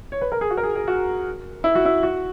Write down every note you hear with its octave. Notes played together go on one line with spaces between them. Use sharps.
C#5
B4
A#4
G#4
F#4
A#4
G#4
G#4
F#4
E4
F#4
E4
F#4